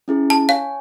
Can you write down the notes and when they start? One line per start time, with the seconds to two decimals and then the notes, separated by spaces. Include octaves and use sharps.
0.08 C#4 E4 G#4
0.30 A5
0.49 C#5 F5 G#5